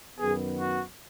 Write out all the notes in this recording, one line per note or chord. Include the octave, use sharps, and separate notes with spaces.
F#2 D#3 B3 G#4
F#4